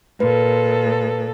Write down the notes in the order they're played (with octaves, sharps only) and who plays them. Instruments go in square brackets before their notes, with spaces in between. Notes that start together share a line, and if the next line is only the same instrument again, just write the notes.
[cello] A#2 A4 [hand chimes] B4